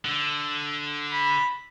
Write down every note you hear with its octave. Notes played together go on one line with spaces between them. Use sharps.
D3
B5